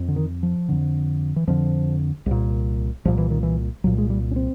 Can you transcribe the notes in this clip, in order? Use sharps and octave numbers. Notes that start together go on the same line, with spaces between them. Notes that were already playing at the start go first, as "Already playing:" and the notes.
Already playing: F2
D3
D#3
F3
F2 D3
E3
F2 D3 F3
C2 A#2
C2 A#2 F3
E3
D#3
E3
C2 A#2 F#3
G#3
G3
C#4
C4